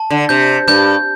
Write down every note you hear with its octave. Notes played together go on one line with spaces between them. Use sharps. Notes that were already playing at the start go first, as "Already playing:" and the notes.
Already playing: A5
D3
C3 G6
G2 G6